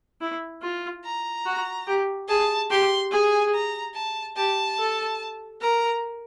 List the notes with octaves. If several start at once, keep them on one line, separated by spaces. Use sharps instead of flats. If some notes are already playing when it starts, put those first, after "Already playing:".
E4
F4
A#5
F#4
G4
G#4 A5
G4 C6
G#4 G#5
A#5
A5
G4 A5
A4
A#4 A#5